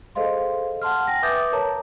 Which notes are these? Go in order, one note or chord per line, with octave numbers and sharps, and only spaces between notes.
G#4 A4 C5 D#5 F5 C6
F#5 A5 C6 F6
G5 G#5 A#6
B4 E5 D6 D#6 G6 A6
A#4 C#5 A5 A#5